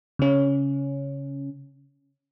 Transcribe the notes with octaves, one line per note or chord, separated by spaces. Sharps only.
C#3 C#4